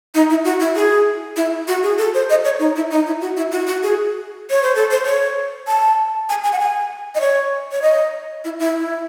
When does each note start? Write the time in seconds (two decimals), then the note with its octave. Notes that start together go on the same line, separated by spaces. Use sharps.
0.14 D#4
0.30 E4
0.44 F#4
0.60 E4
0.75 G#4
1.36 E4
1.68 F#4
1.83 G#4
1.98 A4
2.14 C5
2.30 D#5
2.44 C#5
2.59 D#4
2.76 E4
2.91 D#4
3.06 E4
3.21 F#4
3.37 E4
3.52 F#4
3.67 F#4
3.83 G#4
4.50 C#5
4.63 C5
4.75 A4
4.90 C5
5.06 C#5
5.67 A5
6.29 G#5
6.44 G#5
6.52 F#5
6.59 G#5
7.15 D#5
7.21 C#5
7.72 C#5
7.82 D#5
8.44 E4
8.59 E4
8.75 E4